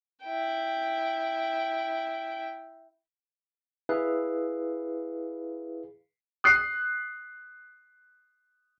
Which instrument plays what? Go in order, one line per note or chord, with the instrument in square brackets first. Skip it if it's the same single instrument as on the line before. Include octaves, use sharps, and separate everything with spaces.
[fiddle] E4 G5
[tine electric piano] E4 G#4 B4 F5
[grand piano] D#6 F#6 C7